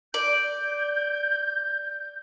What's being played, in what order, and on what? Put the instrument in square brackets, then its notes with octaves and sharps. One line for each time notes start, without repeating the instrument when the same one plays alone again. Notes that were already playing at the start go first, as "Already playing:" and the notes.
[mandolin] D5 [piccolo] G6